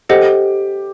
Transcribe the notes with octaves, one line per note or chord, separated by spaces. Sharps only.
G4 A4 C5 D#5 F#5